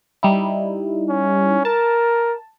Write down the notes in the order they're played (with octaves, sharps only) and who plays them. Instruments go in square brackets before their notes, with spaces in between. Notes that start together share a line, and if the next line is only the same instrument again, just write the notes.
[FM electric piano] G3 D#4 E4
[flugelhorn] C#4
[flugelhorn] A#4 [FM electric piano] A5